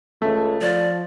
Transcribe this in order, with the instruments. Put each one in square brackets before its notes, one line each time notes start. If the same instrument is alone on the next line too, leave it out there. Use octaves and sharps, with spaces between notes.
[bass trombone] C#2 [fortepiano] A3
[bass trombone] F3 [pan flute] D5